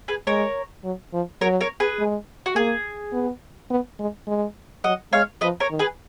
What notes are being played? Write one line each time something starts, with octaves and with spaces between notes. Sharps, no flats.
G#4 B4
G#3 A#4 C#5
F#3
F3
F#3 A#4 C#5
A#4 C#5
G#4 B4
G#3
F#4
A#3 G#4
B3
B3
G#3
G#3
F#3 D#5 F#5
G#3 C#5 F5
F3 B4 D#5
A#4 C#5
D#3
G#4 B4